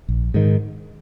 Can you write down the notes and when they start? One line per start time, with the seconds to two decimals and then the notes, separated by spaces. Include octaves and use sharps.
0.09 A#1
0.34 G#2 D#3